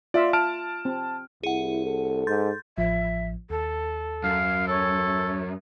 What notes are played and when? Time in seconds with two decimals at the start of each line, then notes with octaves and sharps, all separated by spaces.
0.14 F4 D5 E5 F5
0.33 A5 F6 D7
0.85 C4
1.43 C2 E4 G#4 F#5
1.85 A4
2.27 G#2 C6 G6 A6
2.78 A1 F3 E5
3.50 D#2 A4
4.24 F#2 F5
4.68 A4 C#5